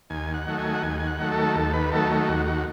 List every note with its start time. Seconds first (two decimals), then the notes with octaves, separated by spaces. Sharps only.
0.10 D#2 G#5
0.34 F#5
0.47 D#3 F#3 A3
0.58 G#5
0.75 F#5
0.83 D#2 G#5
1.00 G#5
1.07 F#5
1.19 D#3 F#3 A3
1.32 A4
1.55 D#2 A4
1.73 B4
1.92 D#3 F#3 A3 A4
2.28 D#2 F#4
2.46 F#4